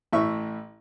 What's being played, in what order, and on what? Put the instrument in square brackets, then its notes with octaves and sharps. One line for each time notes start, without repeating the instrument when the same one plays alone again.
[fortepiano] A1 A2 E5 C#6